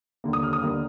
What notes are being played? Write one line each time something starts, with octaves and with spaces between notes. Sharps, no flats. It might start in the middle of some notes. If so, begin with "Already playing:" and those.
D#2 D3 G3 A#3
D#6
F6
D#6
D#2 D3 G3 A#3